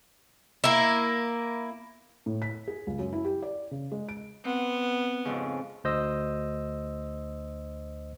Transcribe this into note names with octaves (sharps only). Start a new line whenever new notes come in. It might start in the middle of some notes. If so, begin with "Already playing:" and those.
A#3 E4
A2
B6
G#4
C#2
F#2
E4
G4
D5
C#3
G#3
D7
B3 C4
F2 G#2 C#3
D2 C5 D#5 E6